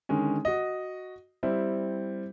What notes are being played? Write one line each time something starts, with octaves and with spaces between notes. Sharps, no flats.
D3 D#3 G#3 C#4
F#4 D#5
G3 C4 E4